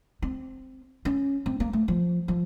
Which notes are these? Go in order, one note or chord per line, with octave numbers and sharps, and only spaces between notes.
C4
C#4
C4
A#3
A3
F3
F3